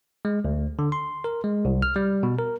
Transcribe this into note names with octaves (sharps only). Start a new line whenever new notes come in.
G#3
D2
D3
C6
A#4
G#3
C2
F6
G3
B2
A#4